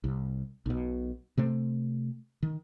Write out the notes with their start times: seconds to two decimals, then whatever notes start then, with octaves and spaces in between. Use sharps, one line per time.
0.04 C2
0.66 B1 B2
1.37 C3 A3 C4
2.43 D#3